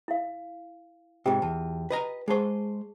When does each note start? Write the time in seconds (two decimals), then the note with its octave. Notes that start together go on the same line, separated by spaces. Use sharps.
0.08 E4 F5
1.26 G#2 C3 F4 G4 G5
1.42 E2 A5
1.90 B4 D#5 A#5
2.28 G#3 G#4 C5 A5 C#6